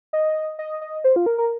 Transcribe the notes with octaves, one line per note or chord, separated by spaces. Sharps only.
D#5
D#5
D#5
C5
F4
A#4
A#4